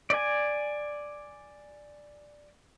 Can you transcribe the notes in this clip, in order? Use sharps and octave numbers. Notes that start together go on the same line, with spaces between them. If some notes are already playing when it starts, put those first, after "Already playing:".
D5 G#5